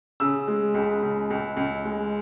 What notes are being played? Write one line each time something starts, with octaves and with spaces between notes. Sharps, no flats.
C#3 E6
G#3
C#2
C#2
C#2
C#2
G#3